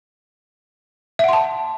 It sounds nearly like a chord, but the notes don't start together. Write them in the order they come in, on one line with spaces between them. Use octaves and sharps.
E5 F#5 C6 A5